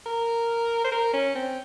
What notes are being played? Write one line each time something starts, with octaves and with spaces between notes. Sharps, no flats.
A#4
C5
A#4
C#4
C4